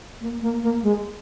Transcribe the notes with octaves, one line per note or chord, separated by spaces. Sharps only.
A#3
A#3
A#3
G#3